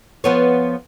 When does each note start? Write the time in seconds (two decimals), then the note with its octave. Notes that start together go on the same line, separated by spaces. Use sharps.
0.24 F3 B3 C#5